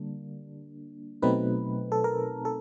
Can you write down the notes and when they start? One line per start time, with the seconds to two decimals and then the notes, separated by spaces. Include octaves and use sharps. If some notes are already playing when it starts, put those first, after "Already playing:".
Already playing: D3 G3 A#3 D4
1.22 B2 F#3 A3 C4 D#4 B4
1.92 A4
2.04 A#4
2.45 A4